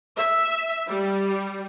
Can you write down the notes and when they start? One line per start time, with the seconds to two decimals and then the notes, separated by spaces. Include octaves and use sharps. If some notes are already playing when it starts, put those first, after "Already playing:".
0.17 E5
0.88 G3